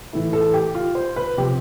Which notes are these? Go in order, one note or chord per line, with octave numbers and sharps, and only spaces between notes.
A2 E3 A3 E4
A4
G4
F4
C5
B4
C3 F3 C4 G4